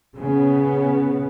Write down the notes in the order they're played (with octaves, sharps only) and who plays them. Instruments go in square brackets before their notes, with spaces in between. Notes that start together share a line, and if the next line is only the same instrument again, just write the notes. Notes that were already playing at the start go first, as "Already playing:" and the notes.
[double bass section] C#3 B3